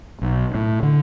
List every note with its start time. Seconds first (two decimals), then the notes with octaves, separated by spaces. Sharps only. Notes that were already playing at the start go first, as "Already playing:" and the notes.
0.22 B1
0.55 A2
0.83 D3